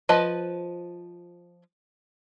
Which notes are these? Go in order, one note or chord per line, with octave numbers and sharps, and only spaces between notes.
F3 B4 D#5 A5